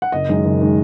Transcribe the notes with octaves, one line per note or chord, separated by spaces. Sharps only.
F#5
F#1 D#5
F#2 D#3 G#3
F#1
D#3 G#3